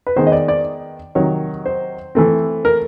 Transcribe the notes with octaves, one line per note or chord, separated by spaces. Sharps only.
B4
D#3 G#3 B3 C5
D#5
D5
D5
C3 D#3 F#3 C#5
C5
E3 A3 C4
A#4